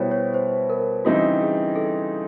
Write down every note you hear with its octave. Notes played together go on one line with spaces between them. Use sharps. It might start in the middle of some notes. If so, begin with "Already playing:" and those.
Already playing: B2 G3 B3 E4 C5 C#5
C#5
C5
A#4
C#3 E3 G3 C4 D#4 F#4
G#4
A4